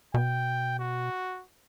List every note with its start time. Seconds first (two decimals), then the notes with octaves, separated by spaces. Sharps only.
0.14 B2 G5
0.79 F#4